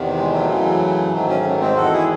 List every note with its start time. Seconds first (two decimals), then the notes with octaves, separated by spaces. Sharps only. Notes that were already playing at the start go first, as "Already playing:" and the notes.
Already playing: E2 C3 D#3
0.17 G#3
0.32 F#3 A3
0.48 F#2 C#3 E3
1.13 G#2 D#3 F#3 A3
1.28 A3 C#4
1.44 F#3 A3
1.60 G#3 C4
1.77 E2 D#3 F#4 A4
1.93 E4 G#4